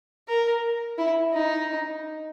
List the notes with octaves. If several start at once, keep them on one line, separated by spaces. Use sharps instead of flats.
A#4
E4
D#4